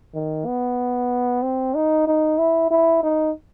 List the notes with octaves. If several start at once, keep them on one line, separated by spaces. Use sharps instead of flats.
D#3
B3
C4
D#4
D#4
E4
E4
D#4